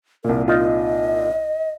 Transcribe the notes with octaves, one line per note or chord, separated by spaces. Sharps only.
C2 A#2 A#4
D#4 F4 D#5